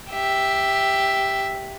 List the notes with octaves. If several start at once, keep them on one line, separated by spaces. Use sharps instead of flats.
G4 E5